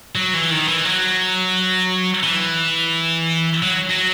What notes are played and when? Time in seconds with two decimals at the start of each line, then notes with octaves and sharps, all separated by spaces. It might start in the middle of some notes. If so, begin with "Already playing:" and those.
0.15 F#3
0.34 E3
0.51 D#3
0.68 E3
0.85 F#3
2.24 E3
3.63 F#3
3.90 F#3